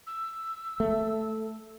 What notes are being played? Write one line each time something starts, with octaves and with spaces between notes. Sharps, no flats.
E6
A3